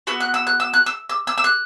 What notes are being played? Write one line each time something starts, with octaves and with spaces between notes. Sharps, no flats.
B3 F#4 E6
F#6
E6
F#6
E6
F#6
E6
E6
E6
E6
F#6